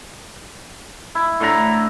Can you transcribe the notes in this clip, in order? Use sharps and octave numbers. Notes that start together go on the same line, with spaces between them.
E4
A2 D3 A#5